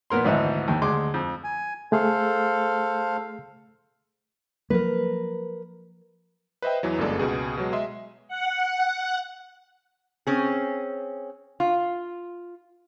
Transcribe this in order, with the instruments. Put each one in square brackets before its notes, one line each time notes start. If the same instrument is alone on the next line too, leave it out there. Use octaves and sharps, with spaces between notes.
[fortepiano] A#2 B3 A#4 C6
G#1 D2 G#2 E3 D#5 E5
D#2 D#3
D2 G#3 C6 D6
F2
[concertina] G#5
[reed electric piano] A3 G#4 [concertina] A4 C5 F5
[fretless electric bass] F3 F#3 A#3 [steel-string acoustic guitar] A#4 B4
[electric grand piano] B4 C5 D#5 E5 G5
E2 E3 F#3
G1 F#2 G#3 A#3 A4 D5
C#2 B2 G#4
B2 F#3 G#3
G#3 D#5 E5 C6
[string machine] F#5
[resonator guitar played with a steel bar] C4 C#4 G#4
F4